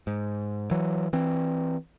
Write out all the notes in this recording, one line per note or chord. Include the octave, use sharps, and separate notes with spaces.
G#2
E3 F#3
E3 C4